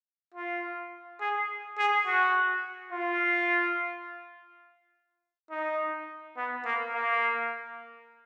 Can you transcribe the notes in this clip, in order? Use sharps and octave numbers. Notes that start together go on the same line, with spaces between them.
F4
G#4
G#4
F#4
F4
D#4
B3
A#3
A#3